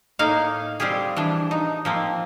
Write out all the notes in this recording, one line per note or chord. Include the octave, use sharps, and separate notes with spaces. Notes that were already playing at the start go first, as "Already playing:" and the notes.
A2 A#3 D#4 F5
G3 C4 F4 G4 G#4
E3 F3 D4
D#4
F3 A#3 C4